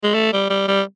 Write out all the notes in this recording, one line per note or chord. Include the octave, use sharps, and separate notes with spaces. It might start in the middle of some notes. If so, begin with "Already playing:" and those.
G#3
A3
G3
G3
G3